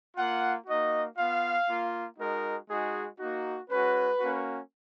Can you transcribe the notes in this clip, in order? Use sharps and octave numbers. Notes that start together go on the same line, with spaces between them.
A#3 F4 F#5
A#3 D#4 F#4 D#5
B3 F4 F5
A#3 F4
G#3 D#4 F#4 A#4
G#3 D#4 F#4 G#4
A#3 D#4 F#4
G#3 C#4 F#4 B4
A#3 C#4 F#4